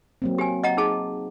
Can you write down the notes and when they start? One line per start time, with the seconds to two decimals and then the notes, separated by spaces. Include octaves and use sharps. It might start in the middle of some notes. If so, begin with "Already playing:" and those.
0.22 F#3 A#3 C4
0.39 G4 G#5
0.64 D#5 F#5 A#5
0.77 D#4 G#4 A5